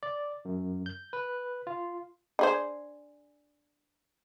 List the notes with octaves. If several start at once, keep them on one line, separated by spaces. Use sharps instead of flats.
D5
F#2
G6
B4
F4
D4 G#4 C5